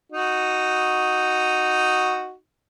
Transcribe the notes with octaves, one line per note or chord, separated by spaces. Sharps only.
D#4 F#4